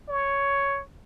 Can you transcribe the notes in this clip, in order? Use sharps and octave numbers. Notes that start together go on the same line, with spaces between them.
C#5